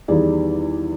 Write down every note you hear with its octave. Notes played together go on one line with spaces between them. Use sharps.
E2 D#3 G3 G#4 D5